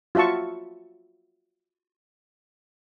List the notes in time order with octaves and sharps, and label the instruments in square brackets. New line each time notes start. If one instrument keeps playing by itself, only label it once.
[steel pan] F4 F#4 E5 A5 C#6